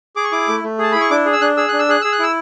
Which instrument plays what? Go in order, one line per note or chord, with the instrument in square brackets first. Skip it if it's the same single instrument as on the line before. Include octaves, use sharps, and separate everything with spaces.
[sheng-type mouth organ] G#4 D6
C#6
E4 D6
A3
A3
G#4 A5
E4 B5
C#6
D4 D6
G#4
E6
D4 F#6
G#4 E6
D4 F#6
E6
G#4 F#6
G#4 E6
F#6
E4 E6